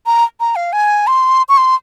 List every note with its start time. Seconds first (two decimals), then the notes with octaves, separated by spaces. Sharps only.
0.06 A#5
0.40 A#5
0.56 F5
0.73 G#5
1.07 C6
1.49 C#6
1.57 C6